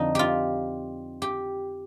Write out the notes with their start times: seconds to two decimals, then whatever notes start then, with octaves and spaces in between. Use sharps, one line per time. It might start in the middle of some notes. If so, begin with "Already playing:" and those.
Already playing: F2 D3 F3 D#4
0.15 F4 G4
1.22 G4